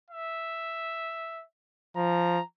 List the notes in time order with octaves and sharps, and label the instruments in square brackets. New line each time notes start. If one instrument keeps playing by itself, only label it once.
[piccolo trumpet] E5
[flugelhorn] F3 [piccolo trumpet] A#5